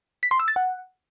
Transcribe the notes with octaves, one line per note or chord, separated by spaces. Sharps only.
B6
C6
E6
A6
F#5